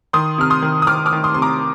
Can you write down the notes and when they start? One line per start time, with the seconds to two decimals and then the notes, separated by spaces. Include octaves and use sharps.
0.13 D#3 C6 D#6
0.38 C3 F6
0.50 C6 D#6
0.62 D#3
0.82 D#6
0.87 D#3 D6 F6
1.06 D6 F6
1.12 D#3
1.24 C6 D#6
1.34 C3 C6
1.42 A#5 D6